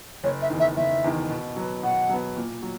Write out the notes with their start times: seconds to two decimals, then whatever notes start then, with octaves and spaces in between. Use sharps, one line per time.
0.24 F#1 C#5
0.42 E5
0.50 E2 D#3
0.60 E5
0.77 F#1 E5
1.04 E2 D#3
1.30 B2
1.56 F#3 B3
1.83 B2 F#5
2.09 F#3 B3
2.36 A#2
2.62 F#3